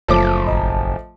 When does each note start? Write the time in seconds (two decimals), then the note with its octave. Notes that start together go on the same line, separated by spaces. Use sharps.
0.08 F#1 F3 A3 D6
0.47 A1 D#5